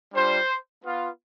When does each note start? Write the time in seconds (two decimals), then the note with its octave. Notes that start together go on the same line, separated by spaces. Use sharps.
0.13 G3 D4 F4 C5
0.85 B3 F4